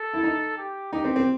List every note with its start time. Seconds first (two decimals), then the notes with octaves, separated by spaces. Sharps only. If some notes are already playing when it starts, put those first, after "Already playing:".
Already playing: A4
0.14 E4
0.23 D#4
0.58 G4
0.93 D#4 G4
1.04 C4
1.16 C4